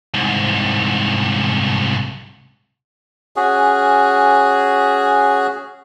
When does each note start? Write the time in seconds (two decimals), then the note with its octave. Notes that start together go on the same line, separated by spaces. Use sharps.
0.14 C2 G#2
3.36 C#4 F#4 G#4